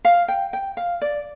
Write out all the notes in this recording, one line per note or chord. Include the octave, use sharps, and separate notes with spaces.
F5
G5
G5
F5
D5